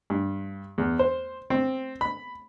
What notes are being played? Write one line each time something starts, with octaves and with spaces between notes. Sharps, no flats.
G2
E2
C5
C4
B5